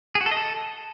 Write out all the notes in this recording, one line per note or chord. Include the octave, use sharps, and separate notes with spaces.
G#4
F#4
A4
D#5
A4